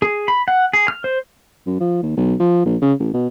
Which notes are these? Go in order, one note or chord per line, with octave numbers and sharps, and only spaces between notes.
G#4
B5
F#5
G#4
F6
C5
F#2
F3
D#2
B1
F3
A#1
C#3
A1
B2